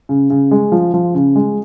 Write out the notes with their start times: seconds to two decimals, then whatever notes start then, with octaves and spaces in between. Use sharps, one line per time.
0.09 C#3
0.30 C#3
0.51 G#3
0.72 F3
0.94 F3
1.14 C#3
1.36 G#3